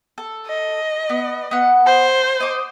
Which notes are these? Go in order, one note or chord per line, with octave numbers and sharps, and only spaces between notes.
A4
D#5
B3
B3 F#5
C5
D#5 D6